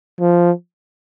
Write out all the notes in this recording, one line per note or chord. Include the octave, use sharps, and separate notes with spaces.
F3